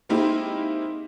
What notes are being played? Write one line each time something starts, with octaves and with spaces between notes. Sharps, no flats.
G#3 A#3 C4 D#4 E4 G4